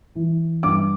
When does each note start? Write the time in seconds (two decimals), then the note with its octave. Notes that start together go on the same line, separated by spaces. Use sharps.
0.15 E3
0.63 G2 D6